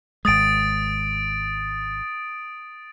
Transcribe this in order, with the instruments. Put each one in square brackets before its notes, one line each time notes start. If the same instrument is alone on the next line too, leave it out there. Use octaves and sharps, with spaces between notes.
[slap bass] G#1 G#3 [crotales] D#6 A6 D7